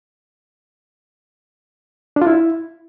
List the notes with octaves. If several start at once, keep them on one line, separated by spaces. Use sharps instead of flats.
D4
F4
E4